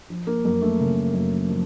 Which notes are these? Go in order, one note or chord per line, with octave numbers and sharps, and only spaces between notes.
F3
A#3
F#2 A#3
A3
C#3
F#2
F3